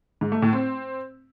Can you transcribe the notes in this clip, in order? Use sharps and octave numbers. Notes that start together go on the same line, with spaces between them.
G#2
A3
A2
C4